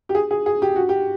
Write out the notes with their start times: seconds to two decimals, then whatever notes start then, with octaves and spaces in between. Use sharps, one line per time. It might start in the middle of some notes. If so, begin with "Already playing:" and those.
0.09 G4
0.15 G#4
0.31 G#4
0.46 G#4
0.62 G4
0.76 F#4
0.89 G4